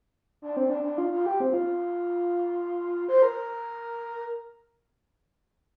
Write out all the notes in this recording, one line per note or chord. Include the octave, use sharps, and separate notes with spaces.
D4
C4
D4
D4
F4
F4
G4
C4
F4
C5
A#4